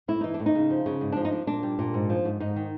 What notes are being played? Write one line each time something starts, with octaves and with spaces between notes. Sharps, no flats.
A2 E4
E3 D#4
D4
A2
D#4
C#3
F3
C#3
G#2
F3 D4
D#4
D4
A#2 D4
G3
A#2
G#2
F3
G#2
G#2 D#4
D#3